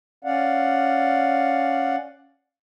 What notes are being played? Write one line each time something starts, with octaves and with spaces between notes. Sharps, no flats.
C#4 D5 F5 F#5